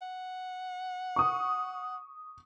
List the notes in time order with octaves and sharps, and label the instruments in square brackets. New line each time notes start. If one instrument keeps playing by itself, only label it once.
[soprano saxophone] F#5
[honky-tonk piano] C#6 D#6